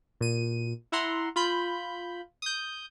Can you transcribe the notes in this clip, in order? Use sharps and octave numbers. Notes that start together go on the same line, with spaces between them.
A#2 D#7
E4 E5 F#5 A#5 C6
F4 B5 G6
D#6 G6